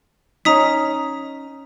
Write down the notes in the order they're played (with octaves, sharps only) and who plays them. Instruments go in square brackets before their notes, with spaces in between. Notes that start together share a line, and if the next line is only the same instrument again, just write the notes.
[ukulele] C#4 D#4 [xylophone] A#5 D#6 B6